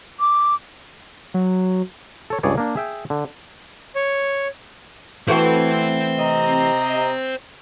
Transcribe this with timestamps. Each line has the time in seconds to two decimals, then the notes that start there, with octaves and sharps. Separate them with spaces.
0.20 D6
1.34 F#3
2.30 A4 C#5
2.43 C#2 G2 G#4 C#5 D5
2.58 A#3 D4
2.76 G#4 E5 G5
3.10 D3
3.95 C#5
5.28 E3 A3 F#4 C5 G5
6.19 C3 D#5 A#5